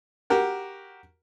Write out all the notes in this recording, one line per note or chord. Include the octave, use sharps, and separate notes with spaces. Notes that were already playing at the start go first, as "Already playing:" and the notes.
F#4 G4 A#4 F#5